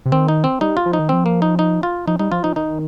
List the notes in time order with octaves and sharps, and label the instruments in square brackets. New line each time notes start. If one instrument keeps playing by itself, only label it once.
[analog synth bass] C3
[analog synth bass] D#3 [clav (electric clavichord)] C4
[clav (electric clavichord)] D#4
C4
[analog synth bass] G3 [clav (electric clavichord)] D#4
[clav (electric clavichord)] F4
[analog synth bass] F3
[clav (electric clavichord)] D#4
[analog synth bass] D#3
[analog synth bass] F3 [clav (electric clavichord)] C4
[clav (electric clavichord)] A#3
D#4
D#4
F4
[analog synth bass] F3 [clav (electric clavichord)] D#4
[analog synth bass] G3 [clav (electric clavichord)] D#4
[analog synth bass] F3 [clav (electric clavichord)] F4
[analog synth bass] F3 [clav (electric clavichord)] D#4
[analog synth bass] D#3 [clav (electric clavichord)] D#4